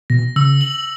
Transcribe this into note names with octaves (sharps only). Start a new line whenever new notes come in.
B2 A#6
C#3 E6
F#7